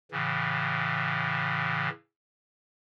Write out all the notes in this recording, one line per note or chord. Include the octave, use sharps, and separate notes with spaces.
A2 C#3 E3